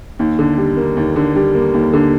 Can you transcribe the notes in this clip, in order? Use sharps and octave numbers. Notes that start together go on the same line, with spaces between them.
D#2
D3
G3
A#3
D#2
D3
G3
A#3
D#2
D3